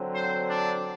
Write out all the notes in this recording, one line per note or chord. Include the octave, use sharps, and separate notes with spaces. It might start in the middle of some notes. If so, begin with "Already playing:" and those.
Already playing: D3 F#3 C4
C5
D4